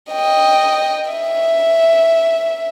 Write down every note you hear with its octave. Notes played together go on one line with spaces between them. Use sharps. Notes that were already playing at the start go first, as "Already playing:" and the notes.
D#5 G5
E5